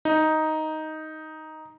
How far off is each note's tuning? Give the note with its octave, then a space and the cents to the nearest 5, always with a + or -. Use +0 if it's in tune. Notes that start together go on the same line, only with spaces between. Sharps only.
D#4 +5